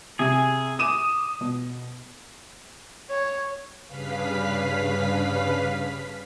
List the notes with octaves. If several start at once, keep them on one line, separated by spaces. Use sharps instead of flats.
C3 G#4 G#5
D6 D#6 D#7 E7
B2
C#5
G2 C#3 B4 F5 B6